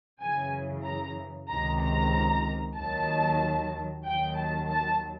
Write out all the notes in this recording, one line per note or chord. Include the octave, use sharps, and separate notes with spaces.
F#2 C#3 E3 G#5
A#5
C#2 C3 D#3 A#5
A#5
D#2 D#3 F#3 A5
D#2 D#3 F#3 G5
A5
A5